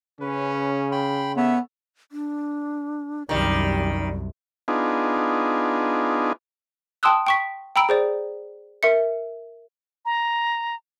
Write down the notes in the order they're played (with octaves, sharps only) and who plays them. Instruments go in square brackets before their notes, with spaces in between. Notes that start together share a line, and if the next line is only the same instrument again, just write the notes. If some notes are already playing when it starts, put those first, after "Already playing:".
[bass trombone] C#3 [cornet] C#4 [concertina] B4
[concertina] G5 B5 C6
[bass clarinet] B3 [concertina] A4 C#5 [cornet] E5
[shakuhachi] D4
[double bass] C2 F#2 [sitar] D#3 G3 [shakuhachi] D5
[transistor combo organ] B3 D4 D#4 F4 G#4
[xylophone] G5 A5 C6 D#6 E6 F#6
G5 C#6 B6
G5 A#5 B5 E6 D7
G#4 C5 D5
A#4 E5 C#7
[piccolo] A#5